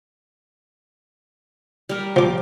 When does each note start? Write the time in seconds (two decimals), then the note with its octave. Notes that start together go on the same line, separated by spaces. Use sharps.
1.89 G3 A#4
2.16 F3 D6